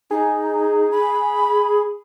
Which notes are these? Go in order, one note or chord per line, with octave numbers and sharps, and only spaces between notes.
D#4 G#4
B5